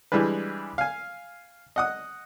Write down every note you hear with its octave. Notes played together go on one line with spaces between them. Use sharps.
E3 G3 G#3 D4 B4
F5 G#5
D#5 F#5 D#6